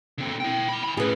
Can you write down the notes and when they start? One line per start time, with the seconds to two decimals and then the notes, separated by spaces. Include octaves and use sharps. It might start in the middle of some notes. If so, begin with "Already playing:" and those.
0.18 D3 C4
0.40 E4 G5
0.69 G5 B5
0.84 G#5 B5
0.97 A2 C#4 G#4 B4